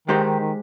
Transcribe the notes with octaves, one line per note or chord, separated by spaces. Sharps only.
D#3 G#3 D#4 G4 C5
D#3
D#3